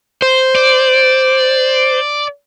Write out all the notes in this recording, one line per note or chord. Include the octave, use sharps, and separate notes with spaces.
C5
D5